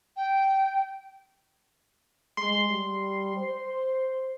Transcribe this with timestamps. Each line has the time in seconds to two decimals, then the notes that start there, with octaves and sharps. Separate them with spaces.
0.17 G5
2.37 G#3 C6
2.69 G3
3.37 C5